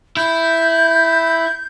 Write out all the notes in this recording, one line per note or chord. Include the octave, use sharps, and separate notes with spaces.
E4 G6